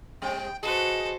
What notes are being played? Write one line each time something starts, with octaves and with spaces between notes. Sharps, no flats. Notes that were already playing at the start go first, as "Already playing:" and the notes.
G3 C4 G5
F#4 G#4 A4 B4 C5 D#5